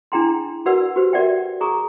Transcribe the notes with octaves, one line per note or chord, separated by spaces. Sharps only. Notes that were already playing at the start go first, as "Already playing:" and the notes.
D4 E4 G#4 G5 A#5 C6
F#4 A#4 B4 D5 F#5 E6
F#4 G4 B4 C5
F#4 A#4 D5 E5 F#5 G5
G#4 A#5 C#6 D#6